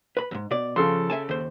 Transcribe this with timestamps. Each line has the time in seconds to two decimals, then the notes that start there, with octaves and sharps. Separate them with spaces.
0.17 B4 B5
0.31 E2 G#2
0.51 B2 D5
0.76 C#3 F3 A4 C6
1.10 E5 G#5 A5
1.29 D#2 C5